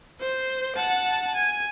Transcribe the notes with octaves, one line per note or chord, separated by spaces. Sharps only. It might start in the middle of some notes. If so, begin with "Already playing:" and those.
C5
F#5 A5
G#5